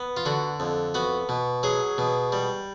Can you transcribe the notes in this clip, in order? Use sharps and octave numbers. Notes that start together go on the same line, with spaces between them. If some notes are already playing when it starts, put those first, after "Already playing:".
Already playing: B3
F4
D3 F#4
F2
B3 F#4
B2
F#3 G#4
B2
G3